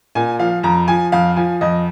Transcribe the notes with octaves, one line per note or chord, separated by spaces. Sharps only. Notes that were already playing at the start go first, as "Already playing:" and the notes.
A#2 G#5
F3 F5
F2 A#5
F3 G#5
F2 F5
F3 G#5
F2 D#5